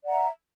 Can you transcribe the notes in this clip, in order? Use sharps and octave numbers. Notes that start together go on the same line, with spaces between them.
D5 E5 F#5 A#5